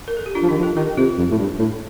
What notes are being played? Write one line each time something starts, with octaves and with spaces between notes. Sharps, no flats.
A#4
A4
G4
D4 F4
F3
D#3 D#4 G4
F3
F4 A4
D#3 G4 A#4
C3 F4 A4
F2
A2
G2
A2